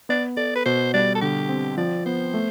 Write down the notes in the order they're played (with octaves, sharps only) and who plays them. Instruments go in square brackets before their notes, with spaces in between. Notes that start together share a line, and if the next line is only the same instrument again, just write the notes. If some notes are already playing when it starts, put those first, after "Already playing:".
[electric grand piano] B3 [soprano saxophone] D5
[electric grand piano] A4 [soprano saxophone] D5
[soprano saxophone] B4
[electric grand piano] B2 [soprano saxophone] C5
[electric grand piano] G3 [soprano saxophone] D5
[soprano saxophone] A4
[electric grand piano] D3 [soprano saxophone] G4
[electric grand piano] C4
[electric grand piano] F3 [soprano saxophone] D5
[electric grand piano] B3 [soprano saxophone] C5
[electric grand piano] A3